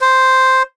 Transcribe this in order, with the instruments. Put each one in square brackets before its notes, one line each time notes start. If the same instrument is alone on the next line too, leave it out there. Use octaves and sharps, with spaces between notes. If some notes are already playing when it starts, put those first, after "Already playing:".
[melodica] C5